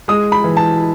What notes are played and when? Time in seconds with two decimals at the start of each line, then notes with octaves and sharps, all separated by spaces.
0.08 G#3 D#6
0.32 B5
0.44 E3
0.57 A5